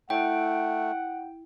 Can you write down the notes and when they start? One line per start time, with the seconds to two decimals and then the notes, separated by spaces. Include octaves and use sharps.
0.10 A3 E4 C#5 F#5 G5